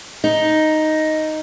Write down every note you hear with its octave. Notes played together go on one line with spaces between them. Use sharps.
D#4